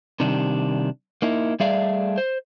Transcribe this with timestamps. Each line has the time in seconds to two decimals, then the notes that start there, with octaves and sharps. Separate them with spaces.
0.20 C3 D#3 G3 D4
1.22 A#3 D#4 E4
1.60 G3 A3 G#4 D5 E5 F5
2.18 C5